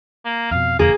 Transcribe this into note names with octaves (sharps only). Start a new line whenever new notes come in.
A#3
F2 B2 F5
E1 F2 D3 A#3 G#4